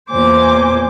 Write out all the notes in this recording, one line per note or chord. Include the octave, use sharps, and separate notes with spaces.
E2 A#2 C5 G#5 D6